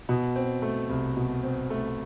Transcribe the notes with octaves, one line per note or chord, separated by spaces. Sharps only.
B2
C4
A3
C2
B2
C4
A3